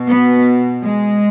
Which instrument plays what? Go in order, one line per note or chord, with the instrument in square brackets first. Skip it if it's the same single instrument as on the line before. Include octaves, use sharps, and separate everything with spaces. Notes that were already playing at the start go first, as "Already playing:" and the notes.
Already playing: [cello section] B2
B3
G#3